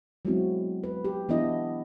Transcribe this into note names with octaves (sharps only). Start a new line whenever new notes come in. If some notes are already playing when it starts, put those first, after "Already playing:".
F#3 G#3 B3 C4 E4 F#4
B4
G4
E3 B3 D4 E4 D#5